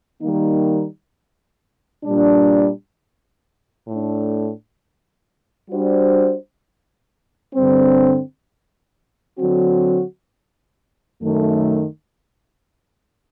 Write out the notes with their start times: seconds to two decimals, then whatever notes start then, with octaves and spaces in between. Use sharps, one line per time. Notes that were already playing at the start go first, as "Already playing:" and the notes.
0.21 D#3 G3 A#3 D#4
2.04 A#2 G3 D4
3.88 A2 A3 D4
5.70 G3 D4 F#4 C5
7.55 G2 D3 G3 C4
9.38 D3 F#3 C4 F#4
11.21 F#2 D#3 A3